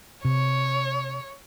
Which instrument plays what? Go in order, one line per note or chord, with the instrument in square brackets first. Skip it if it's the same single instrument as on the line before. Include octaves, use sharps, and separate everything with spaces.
[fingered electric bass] C3 [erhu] C#5